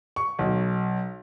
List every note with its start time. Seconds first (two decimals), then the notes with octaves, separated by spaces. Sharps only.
0.16 C#6
0.39 B1